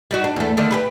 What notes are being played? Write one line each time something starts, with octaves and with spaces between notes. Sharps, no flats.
G3 D#4 F#4
D4
E2 A3
D3 D#3 A3
G4 G#4 B4